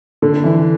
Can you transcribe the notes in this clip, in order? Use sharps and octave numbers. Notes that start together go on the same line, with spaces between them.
D3
E3